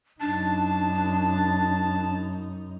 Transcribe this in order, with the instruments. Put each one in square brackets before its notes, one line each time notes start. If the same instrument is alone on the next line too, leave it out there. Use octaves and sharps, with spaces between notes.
[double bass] F#2 D#4 [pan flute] D4 [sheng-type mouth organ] A5